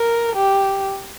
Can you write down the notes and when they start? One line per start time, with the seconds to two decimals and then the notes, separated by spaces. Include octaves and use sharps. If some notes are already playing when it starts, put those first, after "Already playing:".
Already playing: A#4
0.35 G4